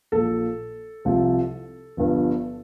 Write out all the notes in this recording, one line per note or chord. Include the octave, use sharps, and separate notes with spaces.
A#1 A#2 F3 A4
C2 C3 F3
G1 G2 F3